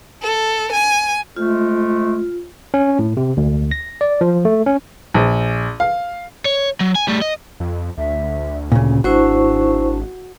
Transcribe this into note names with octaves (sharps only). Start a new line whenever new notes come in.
A4
G#5
F2 G#3 A3 F4
C#4
A2
C3
D2
A#6
D5
F3
A3
C#4
A#1
F5
C#5
F#3
G#5
G3 A3
D#5
F2
D2 E5
A#2 C#3 C#4
G#1 D4 E4 F#4 C5 C#6